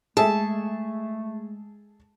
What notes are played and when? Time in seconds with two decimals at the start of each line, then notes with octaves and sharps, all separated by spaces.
0.17 G#3 A3 G#4 A4 E5 A5